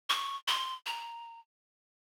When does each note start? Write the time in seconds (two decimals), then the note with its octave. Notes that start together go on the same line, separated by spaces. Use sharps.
0.10 C#6
0.48 C6
0.86 A#5